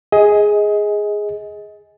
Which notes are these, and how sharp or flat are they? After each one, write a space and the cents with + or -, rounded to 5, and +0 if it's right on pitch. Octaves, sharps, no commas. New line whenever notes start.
G#4 +0 D#5 +25